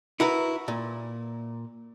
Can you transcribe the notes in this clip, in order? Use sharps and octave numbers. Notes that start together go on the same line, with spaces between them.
E4 F#4 A#4 B4
A#2